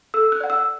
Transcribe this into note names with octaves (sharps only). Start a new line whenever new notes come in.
A4 E6
F#6
D5 F#5
E6